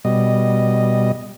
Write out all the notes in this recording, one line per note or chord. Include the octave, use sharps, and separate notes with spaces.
B2 G3 D#5